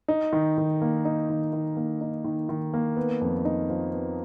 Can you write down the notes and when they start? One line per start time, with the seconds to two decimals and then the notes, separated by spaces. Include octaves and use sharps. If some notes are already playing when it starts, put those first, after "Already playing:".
0.08 D#4
0.33 D#3
0.58 D#3
0.82 A#3
1.05 D#4
1.30 D#3
1.53 D#3
1.77 A#3
2.01 D#4
2.24 D#3
2.49 D#3
2.74 A#3
2.96 B3
3.21 F2
3.45 D#4
3.70 F3
3.92 B3